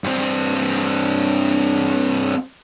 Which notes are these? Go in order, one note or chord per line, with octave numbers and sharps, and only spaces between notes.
G2 C4